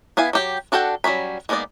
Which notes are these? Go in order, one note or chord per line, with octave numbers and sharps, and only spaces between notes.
B3 E4 F5 G#5
F#3 G4 G5
D4 F#4 A4 F#5 G5
F#3 G3 C#4 B5
G#3 A#3 B3 D#4 D5